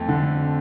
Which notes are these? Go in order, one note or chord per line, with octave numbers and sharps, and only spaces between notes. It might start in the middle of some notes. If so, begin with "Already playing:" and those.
Already playing: F2 A3
D3